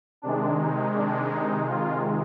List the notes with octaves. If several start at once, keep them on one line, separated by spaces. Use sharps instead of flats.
C3 D#3 G#3 D4
D#4
D4
D#4
F4